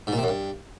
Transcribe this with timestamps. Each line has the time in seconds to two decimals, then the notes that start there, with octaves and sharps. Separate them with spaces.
0.07 G#2
0.13 A#2
0.18 C3
0.23 F#2
0.28 G2